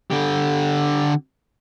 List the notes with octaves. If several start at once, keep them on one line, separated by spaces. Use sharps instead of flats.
D3 G4